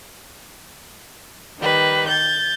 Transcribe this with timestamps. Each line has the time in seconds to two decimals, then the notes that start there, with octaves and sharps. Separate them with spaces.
1.59 D#3 G3 B4
2.09 G6 A6